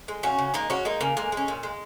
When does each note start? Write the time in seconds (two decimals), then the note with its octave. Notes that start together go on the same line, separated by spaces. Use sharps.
0.08 G#3
0.23 C#3 C#4 F#4
0.38 C#3
0.54 G#3 A#3 D#4
0.70 G#3 C#4 F#4
0.85 G#3 A#3 D#4
1.01 C#3 A#3
1.17 G#3 A#3
1.32 G#3 C#4
1.48 A#2
1.63 G#3